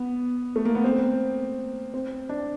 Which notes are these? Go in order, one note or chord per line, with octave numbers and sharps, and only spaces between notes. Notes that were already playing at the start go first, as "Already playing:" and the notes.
Already playing: B3
A3
A#3
B3
C4
C4
D4